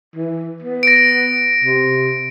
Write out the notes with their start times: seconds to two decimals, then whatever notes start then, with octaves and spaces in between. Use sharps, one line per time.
0.16 E3
0.62 B3
0.83 A#6 D7
1.64 C3